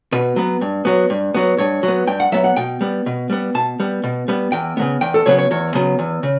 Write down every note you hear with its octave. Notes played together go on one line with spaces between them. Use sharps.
B2 B4
F#3 B3
G2
F#3 B3
G2
F#3 B3
G2 C#5
F#3
B3
G2 G5
F#5
F#3 B3 E5
F#5
B2 G5
G3 B3
B2
G3 B3
B2 A5
G3 B3
B2
G3 B3
E2 G5
C#3 F#3 B3
E2 G5
A4
C#3 F#3 B3 C#5
C#5
E2 C#5
C#3 F#3 B3
E2
C#3